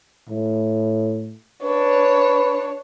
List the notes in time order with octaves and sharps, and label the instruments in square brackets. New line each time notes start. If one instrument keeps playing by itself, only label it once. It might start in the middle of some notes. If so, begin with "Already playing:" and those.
[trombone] A2
[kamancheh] D4 C#5 [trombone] B4